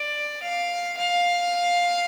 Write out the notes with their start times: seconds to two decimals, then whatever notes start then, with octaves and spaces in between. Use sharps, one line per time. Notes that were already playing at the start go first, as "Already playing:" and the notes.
Already playing: D5
0.43 F5
0.97 F5